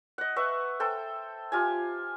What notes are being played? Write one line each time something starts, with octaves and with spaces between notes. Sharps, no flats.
D#5 F#5
B4 E5 F#5 C#6
A4 C5 G5
F4 G4 G#5